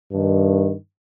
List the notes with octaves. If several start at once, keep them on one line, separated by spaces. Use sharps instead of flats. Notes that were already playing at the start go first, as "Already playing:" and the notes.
G2 D#3